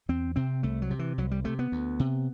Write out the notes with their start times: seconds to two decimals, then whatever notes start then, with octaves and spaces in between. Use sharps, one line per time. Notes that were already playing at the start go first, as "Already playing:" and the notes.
0.09 E2 C4
0.36 C3 C4
0.63 C2 A3
0.82 F#3
0.90 C3
0.99 E3
1.18 C2 F#3
1.31 G3
1.44 C3 A3
1.59 B3
1.72 D2
2.00 C3